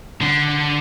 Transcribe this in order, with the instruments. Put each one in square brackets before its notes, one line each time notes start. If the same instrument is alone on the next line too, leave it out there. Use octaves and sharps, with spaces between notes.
[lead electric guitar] D3